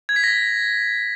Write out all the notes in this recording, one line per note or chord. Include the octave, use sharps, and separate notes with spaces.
G#6
B6
A#6